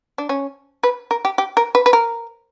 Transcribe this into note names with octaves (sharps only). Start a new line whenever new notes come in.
D4
C#4
B4
A#4
G4
G4
A#4
B4
B4
A#4